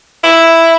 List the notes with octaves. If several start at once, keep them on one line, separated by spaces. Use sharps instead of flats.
E4